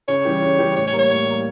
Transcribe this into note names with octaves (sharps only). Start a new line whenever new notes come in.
C#3 C#5
E3 G3 C#4 G4
C#3
E3 G3 C#4 G4
A2 C#5
C#5
G3 A#3
C#5
A2
G3 A#3